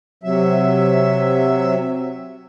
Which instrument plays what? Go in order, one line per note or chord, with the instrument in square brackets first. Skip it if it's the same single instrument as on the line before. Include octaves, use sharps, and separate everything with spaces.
[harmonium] C3 F#3 E5